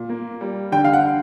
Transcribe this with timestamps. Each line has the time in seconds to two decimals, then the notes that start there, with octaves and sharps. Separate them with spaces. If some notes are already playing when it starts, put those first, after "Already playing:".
Already playing: A#2
0.09 A#3
0.41 G3
0.72 D3 G5
0.84 F5
0.93 F#5